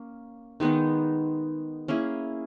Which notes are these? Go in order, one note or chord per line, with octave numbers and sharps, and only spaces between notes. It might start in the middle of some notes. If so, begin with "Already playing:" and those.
Already playing: A#3 C#4
D#3 G#3 B3 D#4
A#3 C#4 E4 G#4